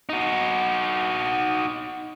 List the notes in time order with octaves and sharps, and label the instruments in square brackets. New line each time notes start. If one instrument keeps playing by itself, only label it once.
[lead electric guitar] D#4 F#4